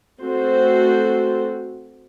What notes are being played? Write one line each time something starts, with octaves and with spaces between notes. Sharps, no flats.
A3 C4 F#4 A4 C5